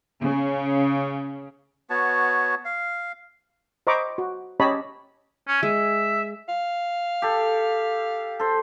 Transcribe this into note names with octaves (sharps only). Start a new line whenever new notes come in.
C#3
B3 F#4 C#5 A5
F5
C5 D#5 A#5 B5 C#6 D6
F#4
C#4 G4 C#5 D#5 A5 B5
C#4
G#3 G#4 E5
F5
G4 A4
A4 C5